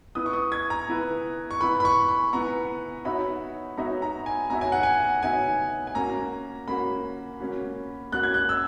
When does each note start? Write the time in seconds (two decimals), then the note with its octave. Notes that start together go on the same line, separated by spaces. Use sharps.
0.15 B3 E4 B4 D#6
0.26 C#6
0.33 D#6
0.52 G#6
0.70 A#5
0.88 B3 E4 B4
1.51 C#6
1.61 B3 E4 B4 B5
1.80 B5
1.85 C#6
2.08 B5
2.33 B3 E4 B4 A#5
3.05 B3 D#4 F#4 C#5 E5 B5
3.77 B3 D#4 F#4 C#5 E5 A#5
4.02 A#5
4.26 G#5
4.50 B3 D#4 F#4 C#5 E5 A#5
4.61 G#5
4.72 F#5
4.83 G#5
5.23 B3 D#4 F#4 C#5 E5 G#5
5.87 G#5
5.95 A#3 C#4 F#4 A#5
6.68 A#3 C#4 F#4 B5
7.40 A#3 C#4 F#4
8.12 A#3 C#4 F#4 F#6
8.23 G#6
8.34 F#6
8.49 E6